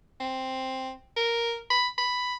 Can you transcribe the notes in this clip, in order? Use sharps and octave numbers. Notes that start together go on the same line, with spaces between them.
C4
A#4
B5
B5